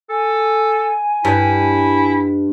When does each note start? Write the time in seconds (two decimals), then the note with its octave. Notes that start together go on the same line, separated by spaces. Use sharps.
0.09 A4 G#5
1.25 G2 E4